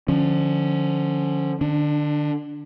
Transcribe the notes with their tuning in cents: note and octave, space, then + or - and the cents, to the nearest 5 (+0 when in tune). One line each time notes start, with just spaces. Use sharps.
D3 +25 F3 +5 C#4 +0
D3 +30 D4 +0